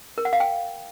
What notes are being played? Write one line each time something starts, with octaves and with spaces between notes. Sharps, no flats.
A#4
F#5
F5
G5